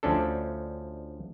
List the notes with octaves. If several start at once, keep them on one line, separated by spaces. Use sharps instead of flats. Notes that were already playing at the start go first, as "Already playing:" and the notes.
D2 F3 C#4 D4 A4